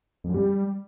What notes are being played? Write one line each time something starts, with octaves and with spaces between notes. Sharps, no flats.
F2
F#2
G3